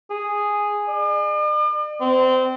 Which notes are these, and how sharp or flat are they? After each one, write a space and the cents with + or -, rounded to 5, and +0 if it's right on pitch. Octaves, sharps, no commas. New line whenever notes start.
G#4 -5
D5 +45
C4 -20